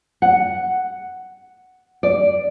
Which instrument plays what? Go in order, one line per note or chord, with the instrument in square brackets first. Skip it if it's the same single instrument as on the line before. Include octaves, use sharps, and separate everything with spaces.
[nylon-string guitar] F#5
D5